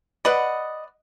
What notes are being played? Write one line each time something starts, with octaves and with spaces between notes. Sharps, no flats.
B4 D5 D#5 F#5